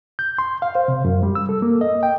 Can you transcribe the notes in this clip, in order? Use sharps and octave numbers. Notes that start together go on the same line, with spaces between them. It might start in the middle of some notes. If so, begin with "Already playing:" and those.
G6
C6
F5
C5
C3
F#2
G3
E6
A4
A#3
D#5
G5